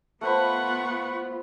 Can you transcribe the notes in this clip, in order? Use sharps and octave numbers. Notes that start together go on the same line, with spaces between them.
A3 B3 F4 B4 C5 F#5 B5 C#6